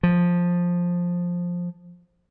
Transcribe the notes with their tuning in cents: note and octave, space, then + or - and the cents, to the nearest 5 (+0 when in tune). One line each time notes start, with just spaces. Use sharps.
F3 +10